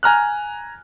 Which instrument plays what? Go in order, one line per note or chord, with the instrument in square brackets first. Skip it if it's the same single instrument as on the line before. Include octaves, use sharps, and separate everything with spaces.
[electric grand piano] G#5 A#5 F6 F#6